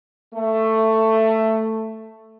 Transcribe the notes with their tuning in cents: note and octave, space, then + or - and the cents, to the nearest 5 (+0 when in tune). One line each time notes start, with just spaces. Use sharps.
A3 +10